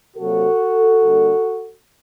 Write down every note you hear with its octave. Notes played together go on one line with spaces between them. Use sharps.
C3 F#3 A#3 F#4 A4
D3 G3 A#3